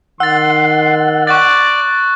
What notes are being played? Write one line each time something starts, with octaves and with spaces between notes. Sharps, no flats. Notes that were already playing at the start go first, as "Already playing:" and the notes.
D#3 F#5 C6 E6 A6
D5 C#6 F#6 A6